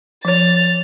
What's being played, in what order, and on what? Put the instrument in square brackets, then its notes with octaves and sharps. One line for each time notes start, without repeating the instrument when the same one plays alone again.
[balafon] F3 C#5 [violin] A6 F7